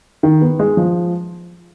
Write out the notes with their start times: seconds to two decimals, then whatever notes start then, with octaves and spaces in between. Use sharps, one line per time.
0.23 D#3
0.41 B3
0.59 G#3
0.77 F3